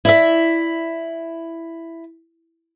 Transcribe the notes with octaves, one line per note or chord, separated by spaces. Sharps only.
E4 D5 E5